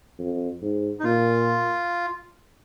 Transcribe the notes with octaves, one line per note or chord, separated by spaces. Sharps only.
F2
G#2
D#4
A#2 F4